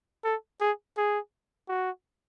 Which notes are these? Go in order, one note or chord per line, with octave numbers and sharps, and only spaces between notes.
A4
G#4
G#4
F#4